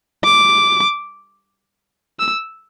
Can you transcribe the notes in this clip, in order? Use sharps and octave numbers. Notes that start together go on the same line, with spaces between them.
D6
E6